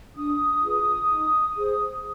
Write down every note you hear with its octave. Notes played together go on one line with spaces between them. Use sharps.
D4 D#6
F4 G#4 B4
D#4
G#4 C5